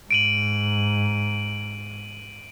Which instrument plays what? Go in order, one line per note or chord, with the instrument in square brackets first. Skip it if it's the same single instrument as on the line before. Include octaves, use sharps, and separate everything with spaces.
[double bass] G#2 [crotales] D7 D#7 F#7